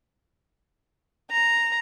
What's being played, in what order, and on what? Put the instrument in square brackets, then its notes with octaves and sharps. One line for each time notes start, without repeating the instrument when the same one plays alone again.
[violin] A#5